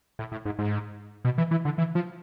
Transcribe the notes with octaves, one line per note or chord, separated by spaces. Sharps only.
A2
A2
G#2
G#2
B2
E3
E3
D3
E3
F3